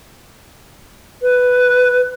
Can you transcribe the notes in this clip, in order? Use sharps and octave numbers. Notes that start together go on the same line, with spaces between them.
B4